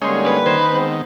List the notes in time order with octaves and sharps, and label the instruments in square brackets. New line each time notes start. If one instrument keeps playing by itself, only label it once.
[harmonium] D3 G3 A#3 [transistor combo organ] G#3 C#4 [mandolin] D#4 C6
[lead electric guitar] B4
[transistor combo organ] D#3 [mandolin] C5 G#5
[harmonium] G#3 B3 C4